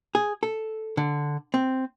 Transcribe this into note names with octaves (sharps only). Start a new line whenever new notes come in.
G#4
A4
D3
C4